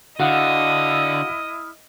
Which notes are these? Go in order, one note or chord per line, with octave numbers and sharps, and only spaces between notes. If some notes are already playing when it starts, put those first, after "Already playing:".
D3 E4 F#4 D#5 F5 F#5 D#6 F6